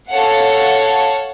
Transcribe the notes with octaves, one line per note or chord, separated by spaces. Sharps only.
A4 C#5 F5 F#5